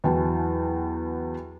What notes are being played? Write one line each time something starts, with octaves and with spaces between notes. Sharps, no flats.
E2 E3 F#3 G5 A5